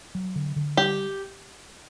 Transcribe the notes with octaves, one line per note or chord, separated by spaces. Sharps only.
F#3
D3
D3
G3 G4